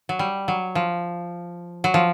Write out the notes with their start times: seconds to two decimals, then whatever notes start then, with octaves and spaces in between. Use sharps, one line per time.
0.09 F#3
0.19 G3
0.48 F#3
0.75 F3
1.84 F#3
1.94 F3